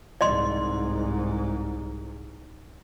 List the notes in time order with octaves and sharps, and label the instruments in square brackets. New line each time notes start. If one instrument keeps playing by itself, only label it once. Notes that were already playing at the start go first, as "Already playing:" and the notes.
[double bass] C2 G#2 [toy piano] D5 D#5 C6